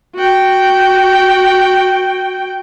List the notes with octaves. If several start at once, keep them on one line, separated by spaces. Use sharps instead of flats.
F#4 G5